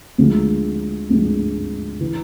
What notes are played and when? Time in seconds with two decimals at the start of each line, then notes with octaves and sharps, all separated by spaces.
0.18 D2 D3 F3 G#3
1.10 D2 D3 F3 G#3
2.01 E3